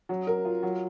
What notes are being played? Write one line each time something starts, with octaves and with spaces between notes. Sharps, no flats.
F#3
A#4
F4
F#3